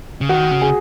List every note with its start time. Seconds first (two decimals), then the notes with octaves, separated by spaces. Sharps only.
0.21 C#3
0.29 D#3 F#4
0.51 C#3
0.62 G#4